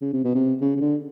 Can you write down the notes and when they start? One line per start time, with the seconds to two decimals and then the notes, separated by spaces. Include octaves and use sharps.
0.02 C#3
0.13 C3
0.24 B2
0.35 C3
0.61 C#3
0.76 C#3
0.81 D3